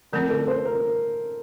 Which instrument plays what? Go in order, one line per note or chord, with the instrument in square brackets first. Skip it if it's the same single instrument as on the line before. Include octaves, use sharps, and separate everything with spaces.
[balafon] D3 F3 A3 C4 [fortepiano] A#4
[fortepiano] A4
C5
A#4